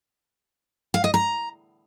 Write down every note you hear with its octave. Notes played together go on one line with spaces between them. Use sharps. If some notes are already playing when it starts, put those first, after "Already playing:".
F5
D#5
A#5